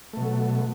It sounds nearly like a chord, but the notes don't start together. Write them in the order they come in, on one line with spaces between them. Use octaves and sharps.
A3 B2 F#3